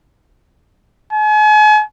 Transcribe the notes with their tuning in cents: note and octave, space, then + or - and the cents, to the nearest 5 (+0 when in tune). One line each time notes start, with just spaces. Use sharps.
G#5 +40